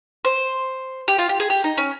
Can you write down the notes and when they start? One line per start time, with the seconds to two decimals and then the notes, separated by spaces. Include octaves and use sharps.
0.25 C5
1.08 G4
1.19 F4
1.29 G4
1.40 G#4
1.50 G4
1.64 D#4
1.78 C#4